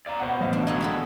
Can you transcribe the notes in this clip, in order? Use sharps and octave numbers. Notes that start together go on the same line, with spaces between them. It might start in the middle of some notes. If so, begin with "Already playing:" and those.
D5 F5 A#5
B2 C5 F#5
A1 D#5 F5
D4
B2 D3 G#3 D#4 F#4
C4 G#4 A4